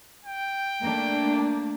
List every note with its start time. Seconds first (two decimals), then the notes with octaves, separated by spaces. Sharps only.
0.25 G5
0.81 A3 A#3 D4